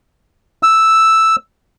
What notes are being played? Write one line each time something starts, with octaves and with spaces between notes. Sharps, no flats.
E6